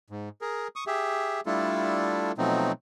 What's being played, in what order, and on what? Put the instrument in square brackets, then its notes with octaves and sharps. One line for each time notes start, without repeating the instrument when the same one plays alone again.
[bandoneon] G#2
G#4 A#4
C#6 D#6
G4 G#4 E5
G3 A3 D4 E4 F4 A4
B2 F3 F#3 A3 C4 D#4